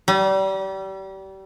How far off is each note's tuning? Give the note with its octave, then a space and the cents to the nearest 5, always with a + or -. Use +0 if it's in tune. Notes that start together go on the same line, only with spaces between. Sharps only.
G3 -30